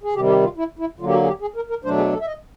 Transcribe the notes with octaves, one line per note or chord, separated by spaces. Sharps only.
G#4
C3 D#3 G3 G4
G4
F4
E4
E4
D3 F#3 A#3 F4
G4
F#4
G#4
G4
G#4
A#4
A#4
B2 F#3 A3 D4 C5
G#4
A4
E5
D#5